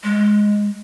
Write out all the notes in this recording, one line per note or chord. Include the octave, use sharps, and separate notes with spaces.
G#3